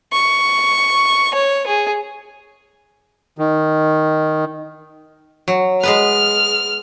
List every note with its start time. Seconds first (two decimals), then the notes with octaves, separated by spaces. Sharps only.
0.13 C#6
1.34 C#5
1.66 G#4
3.38 D#3
5.48 F#3
5.83 G#3 B3 B4 F6